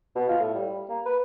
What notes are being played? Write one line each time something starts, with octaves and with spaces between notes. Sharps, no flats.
B2
F4
A2
G3
A#3
B4